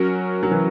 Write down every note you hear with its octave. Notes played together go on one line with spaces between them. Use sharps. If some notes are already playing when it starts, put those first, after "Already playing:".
Already playing: F#3 C#4 F#4 A#4
F#3
E3